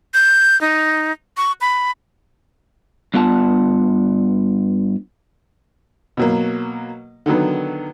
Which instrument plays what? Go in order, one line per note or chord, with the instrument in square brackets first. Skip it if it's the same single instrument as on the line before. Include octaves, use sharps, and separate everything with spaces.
[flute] G6
D#4
C#6
B5
[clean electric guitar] G2 B3 F4 F#5 A5
[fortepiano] B2 F#3 A#3
D3 D#3 F#3 B3